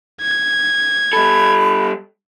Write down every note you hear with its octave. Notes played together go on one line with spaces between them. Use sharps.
G#6
G3 A4 B5